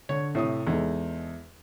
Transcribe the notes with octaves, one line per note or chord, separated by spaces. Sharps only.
D3 C#5
A2 C3 C#5 D#6
E2 G#3 D#4 A4